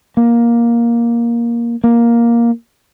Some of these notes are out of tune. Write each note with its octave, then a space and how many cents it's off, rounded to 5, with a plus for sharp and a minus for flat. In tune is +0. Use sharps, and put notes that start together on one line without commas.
A#3 +10
A#3 +10